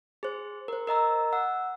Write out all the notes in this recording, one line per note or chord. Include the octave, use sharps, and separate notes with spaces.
G#4 C5
A#4 C5
A#4 D#5 A#5 E6
F#5 E6